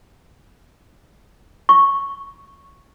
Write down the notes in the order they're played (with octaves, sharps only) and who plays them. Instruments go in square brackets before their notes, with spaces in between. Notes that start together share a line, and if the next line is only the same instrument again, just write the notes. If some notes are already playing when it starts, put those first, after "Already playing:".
[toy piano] C#6